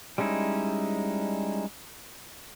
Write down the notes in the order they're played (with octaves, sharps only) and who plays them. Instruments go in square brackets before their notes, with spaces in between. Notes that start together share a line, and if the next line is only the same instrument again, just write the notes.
[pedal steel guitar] G3 G#3 C#4 D#4 E4